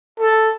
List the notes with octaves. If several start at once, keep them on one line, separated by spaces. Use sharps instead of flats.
A4